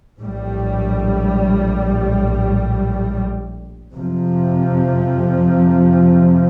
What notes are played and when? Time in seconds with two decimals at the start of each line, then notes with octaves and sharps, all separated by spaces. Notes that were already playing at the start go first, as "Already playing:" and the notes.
0.19 A#1 A2 G3
3.94 F2 C3 F3